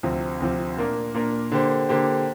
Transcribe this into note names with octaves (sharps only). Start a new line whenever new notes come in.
D2 C3 F3
D2 C3 F3
A#2 A#3 D4 A#4
A#2 A#3 D4 A#4
D3 A#3 G4 C5
D3 A#3 G4 C5